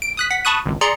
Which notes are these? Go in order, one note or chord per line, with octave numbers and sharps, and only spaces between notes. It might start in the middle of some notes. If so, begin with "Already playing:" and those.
D7
D#6 F#6 B6
F#5 B6
A5 B5 C#6 D#6 F#6 D#7
G#1 C#2
G#4 D5 A#5 C6 C#7